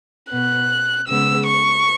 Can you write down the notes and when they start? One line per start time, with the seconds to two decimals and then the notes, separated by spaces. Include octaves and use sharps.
0.31 B2 B3 F#6
1.07 C#3 G#3 B3 E6
1.46 C#6